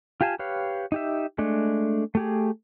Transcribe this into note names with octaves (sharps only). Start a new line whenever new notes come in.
F4 G4 F5 G#5 A5
G4 B4 C#5 F5
D#4 G4 E5
G#3 A3 D4
A3 G4 G#4